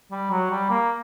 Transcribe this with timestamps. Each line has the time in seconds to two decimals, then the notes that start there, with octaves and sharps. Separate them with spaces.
0.12 G3
0.31 F#3
0.51 G3
0.70 A#3